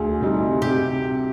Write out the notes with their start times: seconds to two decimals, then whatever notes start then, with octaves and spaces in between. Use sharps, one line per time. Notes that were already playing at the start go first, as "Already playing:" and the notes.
Already playing: D2 G#4
0.21 C3 G3 C4 D#4
0.62 C3 G4